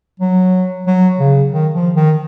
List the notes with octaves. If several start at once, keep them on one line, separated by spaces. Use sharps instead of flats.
F#3
F#3
C#3
D#3
F3
D#3